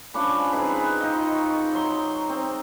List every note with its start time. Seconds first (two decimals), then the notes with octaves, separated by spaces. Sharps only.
0.14 F3 C#4 D4 B5
0.52 C4 D#4 G#4 B4
1.00 D#4 F4 D#5
1.35 C#6
1.72 F#3 C6
2.29 C4